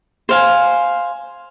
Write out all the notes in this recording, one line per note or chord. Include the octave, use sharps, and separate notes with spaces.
C5 F5 G#5